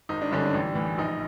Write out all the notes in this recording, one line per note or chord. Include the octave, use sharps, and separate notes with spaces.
G#1 D#4
D4
G2 D3 C#4
D4
A1
A2 E3
A#1 D#4